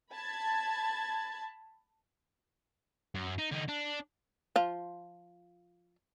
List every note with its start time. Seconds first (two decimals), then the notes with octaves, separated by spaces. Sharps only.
0.12 A5 B5 G#6 A6
3.15 F#2
3.38 D#4
3.51 D3 D#4
3.68 D4
4.56 F3 F4